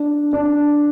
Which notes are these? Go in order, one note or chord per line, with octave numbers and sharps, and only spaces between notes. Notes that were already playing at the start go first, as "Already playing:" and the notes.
Already playing: D4
D4